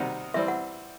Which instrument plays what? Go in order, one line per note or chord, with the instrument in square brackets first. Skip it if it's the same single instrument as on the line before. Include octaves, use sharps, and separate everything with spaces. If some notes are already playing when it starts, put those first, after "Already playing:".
Already playing: [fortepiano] C3 D#3 G3 D#4 F#4
[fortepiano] E3 G3 C4 [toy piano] E5
[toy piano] F#5